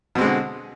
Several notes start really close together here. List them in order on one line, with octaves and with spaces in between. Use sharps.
B2 C4 G#3 D3